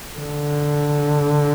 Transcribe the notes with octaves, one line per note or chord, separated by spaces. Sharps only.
D3